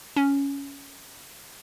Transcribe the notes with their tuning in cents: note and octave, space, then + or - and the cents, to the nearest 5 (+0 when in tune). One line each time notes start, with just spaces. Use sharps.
C#4 +10